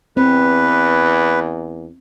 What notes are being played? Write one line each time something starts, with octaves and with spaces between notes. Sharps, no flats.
E2 C4 B4